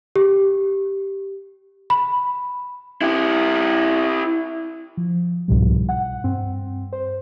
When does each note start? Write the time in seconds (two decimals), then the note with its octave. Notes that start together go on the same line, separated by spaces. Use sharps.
0.16 G4
1.90 B5
3.02 E4 G4
4.97 F3
5.48 C2 G#2 B2 F3 G3
5.89 F#5
6.24 G2 C4
6.93 C5